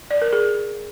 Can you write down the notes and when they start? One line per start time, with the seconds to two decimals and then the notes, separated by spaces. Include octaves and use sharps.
0.11 D5
0.22 A#4
0.33 G#4